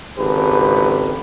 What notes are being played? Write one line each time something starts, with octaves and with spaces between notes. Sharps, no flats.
G#1 C#2 G4 A4 B4